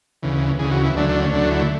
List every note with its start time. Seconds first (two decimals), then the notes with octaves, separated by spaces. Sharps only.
0.23 D2 C#3 E3
0.59 D2 C#3 E3 G#4
0.71 F#4
0.84 E4
0.96 D2 D3 F#3 A3 D4
1.09 D4
1.21 C#4
1.33 D2 D3 F#3 A3 D4
1.51 E4